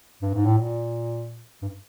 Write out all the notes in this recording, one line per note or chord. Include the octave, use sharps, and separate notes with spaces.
G2
G#2
A2
A#2
G2